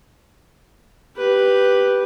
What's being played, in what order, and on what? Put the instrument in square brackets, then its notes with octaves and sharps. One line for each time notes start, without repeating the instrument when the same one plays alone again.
[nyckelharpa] G4 B4